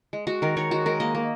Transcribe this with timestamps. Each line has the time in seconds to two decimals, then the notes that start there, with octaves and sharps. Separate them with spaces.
0.13 G#3
0.27 G#3 F#4
0.42 D#3 A#4
0.57 D#3 C#5
0.71 G#3 F#4
0.86 G#3 A#4
1.00 A#3 D#5
1.15 A#3